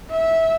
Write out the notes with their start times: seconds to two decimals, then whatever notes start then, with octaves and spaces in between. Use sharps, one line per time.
0.10 E5